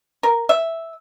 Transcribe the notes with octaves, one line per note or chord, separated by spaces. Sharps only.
A#4
E5